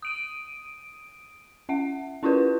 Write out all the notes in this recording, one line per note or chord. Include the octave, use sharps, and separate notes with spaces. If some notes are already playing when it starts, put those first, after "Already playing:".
D#6 D7 D#7
C#4 E5 F#5
C#4 E4 F4 G4 A#4 B4